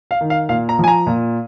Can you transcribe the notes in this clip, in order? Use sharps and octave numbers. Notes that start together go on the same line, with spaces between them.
F5
D#3
F5
A#2 F5
A#5
F3 G#5
A#5
A#2